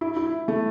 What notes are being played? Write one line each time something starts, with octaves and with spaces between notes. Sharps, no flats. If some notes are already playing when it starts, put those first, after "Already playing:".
E4
E4
A3